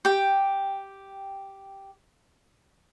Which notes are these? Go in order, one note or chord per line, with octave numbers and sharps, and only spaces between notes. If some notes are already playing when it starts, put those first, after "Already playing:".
G4 G5